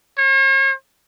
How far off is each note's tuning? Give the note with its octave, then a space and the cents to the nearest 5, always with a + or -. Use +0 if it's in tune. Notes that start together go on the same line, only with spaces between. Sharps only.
C#5 -45